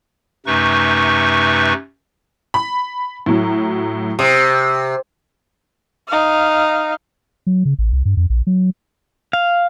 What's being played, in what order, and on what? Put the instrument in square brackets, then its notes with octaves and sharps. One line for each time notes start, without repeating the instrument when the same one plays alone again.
[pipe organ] F#2 C3 A3 D#4 B4 C#6
[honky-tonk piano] B5
A2 F#3
[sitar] C3 [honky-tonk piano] D#6
[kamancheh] D#4 F5
[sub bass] F#3
C#3
A1
C2
G2
F2
A#1
F#3
[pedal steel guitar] F5